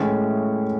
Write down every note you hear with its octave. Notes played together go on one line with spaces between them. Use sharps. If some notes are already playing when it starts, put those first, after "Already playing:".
Already playing: A2 E3 G#3 C#4 G#4